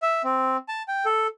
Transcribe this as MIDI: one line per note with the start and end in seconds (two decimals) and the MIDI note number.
0.02 0.22 76
0.24 0.57 60
0.68 0.82 81
0.88 1.05 79
1.05 1.27 69